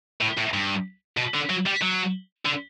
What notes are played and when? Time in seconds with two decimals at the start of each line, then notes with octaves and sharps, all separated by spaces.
0.21 A2
0.38 A2
0.54 G2
1.17 B2
1.34 D3
1.49 F#3
1.66 G3
1.82 F#3
2.46 D3